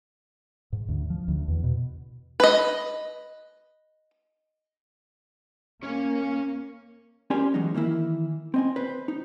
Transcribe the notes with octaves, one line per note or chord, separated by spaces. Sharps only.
G#2
D2
F3
D2
E2
B2
B4 D#5
A#3 C#4 C#5
C#4 G4 A#4 C5 D5 G#5
E3 F#3 G#3 B3 D#4
D#3 E3 A#3 E4
C4 D#5 G#5
B4 C5
D#4